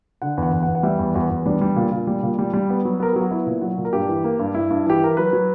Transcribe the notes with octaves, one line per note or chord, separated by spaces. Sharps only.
D3 F#5
E2
F#5
E2
F#5
E2
F#5
G3 E5
E2
E2 F#4
E2
G3 D4
G3
A#2
A#2
G3
A#2
G3
G3
B3
F#3
B3 A#4
F#3 G4
F#4
B3 E4
A#2
F#3 F#4
A#2
A#4
G2 G4
E3
A#3
G2
G2 E4
G2
E3 G4
E3 A#4
F#3 B4
F#3